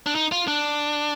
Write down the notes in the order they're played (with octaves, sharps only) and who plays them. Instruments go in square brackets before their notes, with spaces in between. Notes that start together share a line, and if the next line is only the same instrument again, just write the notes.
[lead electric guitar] D4
D#4
F4
D4